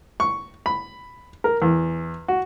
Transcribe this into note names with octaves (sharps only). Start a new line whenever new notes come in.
C#6
B5
A#4
E2
F#4